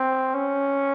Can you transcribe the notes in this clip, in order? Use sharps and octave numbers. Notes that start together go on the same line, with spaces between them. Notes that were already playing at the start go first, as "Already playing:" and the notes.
Already playing: C4
C#4